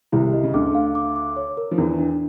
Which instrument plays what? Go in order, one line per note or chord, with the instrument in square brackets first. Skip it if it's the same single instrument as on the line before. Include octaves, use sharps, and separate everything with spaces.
[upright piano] C2 C3 [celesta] E4
[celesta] D#5
[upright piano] C#3
[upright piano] D2 D3 [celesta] D6
[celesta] F5
D6
D6
C#5
A#4
[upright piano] F3
[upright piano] E2 E3 [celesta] D4
[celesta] D4